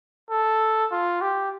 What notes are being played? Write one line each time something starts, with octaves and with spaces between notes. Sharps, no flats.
A4
F4
G4